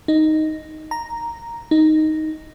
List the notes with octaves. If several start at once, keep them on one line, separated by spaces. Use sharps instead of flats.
D#4
A#5
D#4